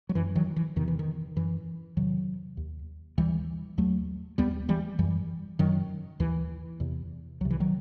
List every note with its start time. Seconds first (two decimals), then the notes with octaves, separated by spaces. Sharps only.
0.09 F#3
0.15 F#2 E3
0.35 D#3 F#3
0.56 E3
0.76 E2 C3 D#3
0.88 E3
0.99 D#3
1.36 F#2 E3
1.96 E2 C3 D#3 F#3
2.57 D#2
3.18 D#2 E3 G3
3.78 D#2 F#3 A3
4.38 D#2 G3 B3
4.69 E3 G3
4.99 F#2 E3 G3
5.59 F#2 D#3 F#3
6.20 D#2 E3
6.80 E2 C3
7.40 C2 C3 F#3
7.50 E3
7.60 D#3 F#3